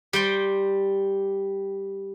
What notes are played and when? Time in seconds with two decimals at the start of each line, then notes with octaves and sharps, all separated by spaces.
0.13 G3 G5 C6